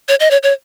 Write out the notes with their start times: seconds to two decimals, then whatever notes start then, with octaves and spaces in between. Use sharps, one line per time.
0.09 C#5
0.20 D#5
0.31 C#5
0.43 C#5